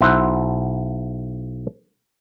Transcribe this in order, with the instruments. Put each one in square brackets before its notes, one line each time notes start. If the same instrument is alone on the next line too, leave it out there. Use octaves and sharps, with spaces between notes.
[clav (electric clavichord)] B1 E4 C5 F#5